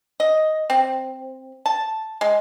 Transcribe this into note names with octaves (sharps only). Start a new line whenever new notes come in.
D#5
C4
A5
G#3